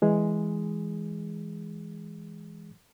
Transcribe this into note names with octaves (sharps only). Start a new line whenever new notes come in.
E3 G#3 G#4